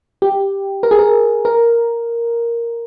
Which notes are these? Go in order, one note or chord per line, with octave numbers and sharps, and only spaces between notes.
G4
A#4
G#4
A#4
A#4